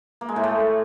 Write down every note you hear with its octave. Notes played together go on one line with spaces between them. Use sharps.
A#3
G#3
A2
A3